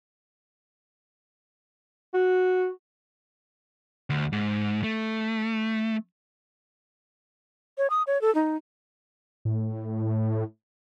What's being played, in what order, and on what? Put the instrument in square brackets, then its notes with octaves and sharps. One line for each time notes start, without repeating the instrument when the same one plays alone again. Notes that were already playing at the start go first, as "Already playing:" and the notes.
[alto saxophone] F#4
[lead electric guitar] D2
G#2
A3
[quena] C#5
D#6
C#5
A4
D#4
[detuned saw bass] A2